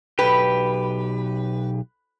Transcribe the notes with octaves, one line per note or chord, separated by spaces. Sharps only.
B1 G4 B4